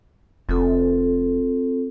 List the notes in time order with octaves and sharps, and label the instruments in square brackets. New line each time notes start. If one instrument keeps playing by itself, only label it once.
[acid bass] F1 [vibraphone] C4 F4 A4